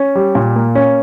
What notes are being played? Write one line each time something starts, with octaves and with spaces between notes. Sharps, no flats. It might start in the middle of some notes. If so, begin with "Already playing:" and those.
Already playing: C#4
G3
A#2
A#3
C#4